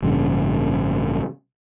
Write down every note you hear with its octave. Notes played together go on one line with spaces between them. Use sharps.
A1 G2 C#3